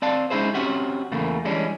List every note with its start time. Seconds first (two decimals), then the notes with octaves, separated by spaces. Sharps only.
0.02 C4 D5 F5 A5
0.30 G#3 C#4 D#4 E4 G#4 C5
0.54 C4 C#4 F#4 G4
1.12 E2 C#3 A3 A#3
1.45 E3 G3 G#3 C#4 D4